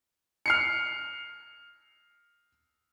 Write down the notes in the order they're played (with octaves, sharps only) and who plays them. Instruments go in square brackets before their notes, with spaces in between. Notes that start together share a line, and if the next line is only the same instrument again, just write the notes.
[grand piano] F6 C7 C#7